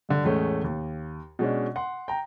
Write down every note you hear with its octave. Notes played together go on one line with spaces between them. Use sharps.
G2 D3
E2 A2 G#3 A3 C#4
D#2
B2 G#3 C#4 D4
F#5 C6
G5 A#5